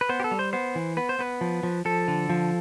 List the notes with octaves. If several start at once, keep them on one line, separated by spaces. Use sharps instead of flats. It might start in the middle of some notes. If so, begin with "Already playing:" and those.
B4
B3 C5
G4
A4
G3
C5
B3 C5
E3
B3 B4
C5
B3 B4
F3
F3
F3 A4
D3
F3